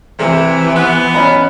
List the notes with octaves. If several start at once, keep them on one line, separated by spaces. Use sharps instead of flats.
C3 E3
B3
C#4 D#5 B5